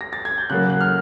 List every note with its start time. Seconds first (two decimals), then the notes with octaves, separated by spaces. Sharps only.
0.01 A#6
0.13 A6
0.25 G#6
0.38 G6
0.50 C#3 F#3 A#3 F#6
0.70 F#6
0.81 F6